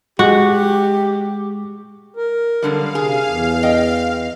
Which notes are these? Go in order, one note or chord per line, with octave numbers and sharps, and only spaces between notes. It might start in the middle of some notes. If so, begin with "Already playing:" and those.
G#3 F#4 G4
A#4
F#2 D3 G3 F5
C3 G#4
E2
D#5 G5